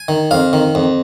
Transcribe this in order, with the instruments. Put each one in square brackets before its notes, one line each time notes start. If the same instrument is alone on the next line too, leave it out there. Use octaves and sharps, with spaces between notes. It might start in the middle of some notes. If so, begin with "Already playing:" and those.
Already playing: [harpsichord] G#5
D#3
F2 F5
D#3
F2